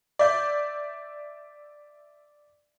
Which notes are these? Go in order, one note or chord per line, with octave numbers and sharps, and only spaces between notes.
D5 E5 G6